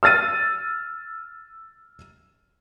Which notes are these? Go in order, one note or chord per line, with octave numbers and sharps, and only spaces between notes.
E6 F6 A6 D#7